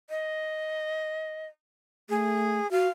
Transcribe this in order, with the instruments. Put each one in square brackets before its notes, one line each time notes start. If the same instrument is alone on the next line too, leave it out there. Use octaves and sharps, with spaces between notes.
[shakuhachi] D#5
[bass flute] A3 [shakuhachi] G#4
[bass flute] F#4 [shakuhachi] F5